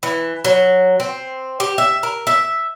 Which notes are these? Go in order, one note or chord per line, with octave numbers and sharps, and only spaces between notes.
E3
F#3
C4
G4
E5
A#4
E5